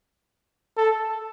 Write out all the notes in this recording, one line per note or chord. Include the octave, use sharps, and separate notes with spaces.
A4